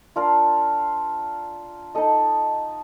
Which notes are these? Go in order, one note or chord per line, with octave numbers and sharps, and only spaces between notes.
D4 F4 A#4 F5
D#4 A4 D#5